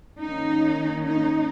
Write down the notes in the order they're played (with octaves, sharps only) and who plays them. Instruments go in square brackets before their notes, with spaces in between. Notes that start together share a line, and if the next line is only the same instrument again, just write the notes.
[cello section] D#3 A#3 C#4 D#4
D#4